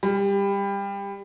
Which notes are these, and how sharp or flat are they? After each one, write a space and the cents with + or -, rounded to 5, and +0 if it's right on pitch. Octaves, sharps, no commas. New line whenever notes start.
G3 +25